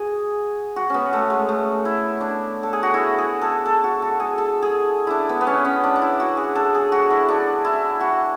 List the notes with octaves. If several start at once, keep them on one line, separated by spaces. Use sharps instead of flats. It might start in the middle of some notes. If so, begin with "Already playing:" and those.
Already playing: F#4 G#4
F#4
B3 C#4
A3
G#3
A3
E4
D4
A4
G#4
F#4
E4
G#4
A4
A4
F#4
A4
G#4
A4
G#4
D4 E4
B3
B3
C#4
C#4
D4
D4
E4
F#4
G#4
A4
G#4
F#4
E4
D4
E4
F#4